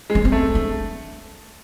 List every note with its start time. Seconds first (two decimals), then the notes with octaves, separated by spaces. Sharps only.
0.10 G#3
0.15 C#4
0.25 C4
0.32 A3
0.55 D4